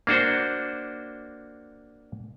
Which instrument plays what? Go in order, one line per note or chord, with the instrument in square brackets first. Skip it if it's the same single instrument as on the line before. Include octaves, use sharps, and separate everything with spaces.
[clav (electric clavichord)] A#3 D4 F#4 C5